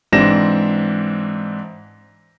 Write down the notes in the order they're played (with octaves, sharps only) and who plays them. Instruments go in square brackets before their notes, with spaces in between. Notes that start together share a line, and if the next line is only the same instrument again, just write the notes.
[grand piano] G#2 E3 C4 D4 A#6 E7